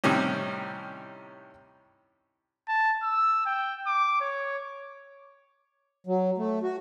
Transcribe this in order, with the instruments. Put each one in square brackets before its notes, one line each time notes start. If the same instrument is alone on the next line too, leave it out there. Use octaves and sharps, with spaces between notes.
[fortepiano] A2 C3 D#3 G3 C#4
[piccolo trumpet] A5
E6
G5
D6
C#5
[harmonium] F#3
A3
F#4